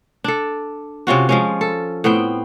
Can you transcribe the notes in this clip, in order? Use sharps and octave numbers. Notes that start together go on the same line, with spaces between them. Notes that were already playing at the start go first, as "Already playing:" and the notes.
D4 A4
C3 C#4 F4 F#4
F3 G#3 C#4
A4
A2 B3 C4 G5